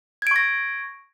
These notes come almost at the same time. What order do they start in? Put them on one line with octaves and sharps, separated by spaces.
G#6 D7 C#6 A#6